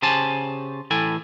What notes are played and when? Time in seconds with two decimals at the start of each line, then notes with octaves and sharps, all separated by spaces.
0.02 C#3 G4 C5 G#5 A5
0.91 A2 E3 A4 G5 G#5